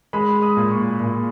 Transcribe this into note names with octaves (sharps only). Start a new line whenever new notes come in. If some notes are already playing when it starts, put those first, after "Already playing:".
G#3 B5
D#6
A#2
C#6
A#2